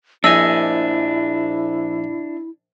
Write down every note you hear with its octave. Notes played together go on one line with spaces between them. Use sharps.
A#1 D4 E4 D#5 E5 G#5 E6